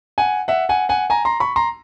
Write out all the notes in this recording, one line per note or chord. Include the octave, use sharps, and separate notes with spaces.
F#5 G#5
E5 F#5
F#5 G#5
F#5 G#5
G#5 A#5
A#5 C6
B5 C#6
A#5 C6